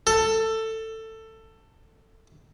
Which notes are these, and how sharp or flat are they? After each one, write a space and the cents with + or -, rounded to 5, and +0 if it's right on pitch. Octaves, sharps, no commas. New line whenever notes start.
A4 +15